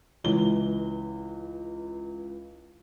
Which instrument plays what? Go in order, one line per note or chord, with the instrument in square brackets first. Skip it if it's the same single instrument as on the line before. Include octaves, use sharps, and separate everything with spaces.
[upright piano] C#2 E3 G7